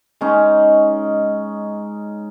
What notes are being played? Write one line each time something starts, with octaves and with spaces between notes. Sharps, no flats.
G#3 C#4 D#4